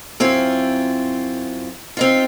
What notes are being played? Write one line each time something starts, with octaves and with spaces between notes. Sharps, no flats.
F#2 C4 E4 F4
C4 D#4 F4